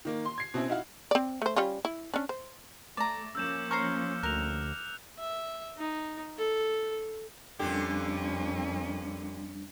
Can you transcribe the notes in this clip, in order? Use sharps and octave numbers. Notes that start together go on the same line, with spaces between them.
D#3 A#3
C6
G#6 C7
B2 C4 C#4 E4
D#4 E4 F#4 F5
C4 D5
A3 C5
G3 C#4 F4
E4
C#4 D4
C5
A3 D5 A#5 D6
F3 A#3 C#4 E6 G6 E7
C5 A#5 C#6 F6 C#7
D2 A#4 F#6 F7
E5
D#4
A4
F2 A#2 D3 G3 C#4 D4 G4